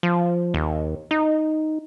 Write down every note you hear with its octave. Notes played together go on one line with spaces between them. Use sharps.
F3
D#2
D#4